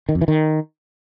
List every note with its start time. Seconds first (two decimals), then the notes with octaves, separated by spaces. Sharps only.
0.09 D#3
0.15 F2
0.21 E3
0.28 D#3